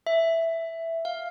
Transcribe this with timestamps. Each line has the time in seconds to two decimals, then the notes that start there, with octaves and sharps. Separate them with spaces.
0.07 E5
1.05 F5